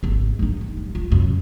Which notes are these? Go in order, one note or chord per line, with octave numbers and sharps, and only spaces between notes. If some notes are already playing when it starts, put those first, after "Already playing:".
G#1 G3
G2 D#4
G1
G3
F4
F#2 C3